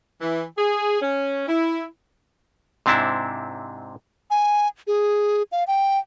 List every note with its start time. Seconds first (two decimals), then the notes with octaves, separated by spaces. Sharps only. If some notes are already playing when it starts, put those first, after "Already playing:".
0.21 E3
0.58 G#4
1.02 C#4
1.48 E4
2.86 G#2 C3 C4 D4 E4
4.30 G#5
4.87 G#4
5.52 F5
5.67 G5